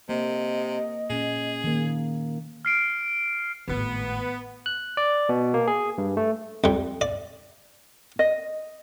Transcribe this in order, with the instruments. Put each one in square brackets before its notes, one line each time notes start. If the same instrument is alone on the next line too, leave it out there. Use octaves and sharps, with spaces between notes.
[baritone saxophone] C3 [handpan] A#3 [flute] D#5
[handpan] A#2 C#4 [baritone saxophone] G#4
[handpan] D#3 A#3
[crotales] F6 C7 D7
[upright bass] G#1 A2 [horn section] B3
[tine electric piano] F#6
D5
B2
A#3
G#4
G2
A3
[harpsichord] F2 G3
D5
[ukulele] D#5